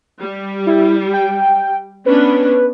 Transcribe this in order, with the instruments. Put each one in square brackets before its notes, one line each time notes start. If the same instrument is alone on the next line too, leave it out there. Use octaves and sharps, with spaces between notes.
[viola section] G3
[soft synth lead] E4
G5
[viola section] B3 C#4 D4 [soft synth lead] B4